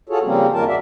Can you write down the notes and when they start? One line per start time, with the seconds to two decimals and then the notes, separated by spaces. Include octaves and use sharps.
0.09 F4 F#4 G#4 A4 C#5
0.24 C#3 F3 G3 A#3 C4 C#4
0.53 F#2 D#3 A#3 F4 A#4 A5
0.68 D2 G2 F#4 D5 E5